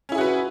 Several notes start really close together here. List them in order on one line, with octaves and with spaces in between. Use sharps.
C#4 E4 G#4 F#4 B4